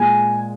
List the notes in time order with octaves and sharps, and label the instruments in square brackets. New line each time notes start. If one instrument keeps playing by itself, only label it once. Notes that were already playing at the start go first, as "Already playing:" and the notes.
Already playing: [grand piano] A#2 G#3 G#5